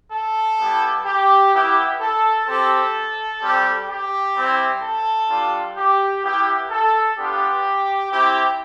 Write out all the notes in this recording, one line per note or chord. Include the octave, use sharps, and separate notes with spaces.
A4
G3 B3 E4 G4
G4
B3 E4 G4
A4
C4 G4 A4
G3 C4 G4
G4
G3 C4 E4
A4
G3 D4 F4
G4
B3 E4 G4
A4
B3 D4 F4 G4
C4 E4 G4